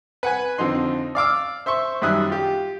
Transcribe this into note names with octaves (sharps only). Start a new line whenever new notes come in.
B4 F#5 G#5
F2 D3 F3 D#4 C6
D5 F5 D6 E6
C5 E5 C6 C#6
F#2 D#3 G3 E5 D#6 F#6
F4 G4